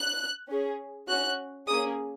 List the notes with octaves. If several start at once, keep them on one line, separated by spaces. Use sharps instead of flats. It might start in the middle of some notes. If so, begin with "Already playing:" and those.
Already playing: F#6
C#4 G#4
C#4 F#4 F#6
A#3 C#4 G#4 D#6